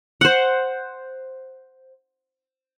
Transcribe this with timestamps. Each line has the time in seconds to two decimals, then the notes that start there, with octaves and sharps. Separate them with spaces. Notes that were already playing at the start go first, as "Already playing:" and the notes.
0.21 C5 F#5